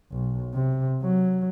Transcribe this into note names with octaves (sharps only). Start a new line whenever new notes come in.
B1
C3
F#3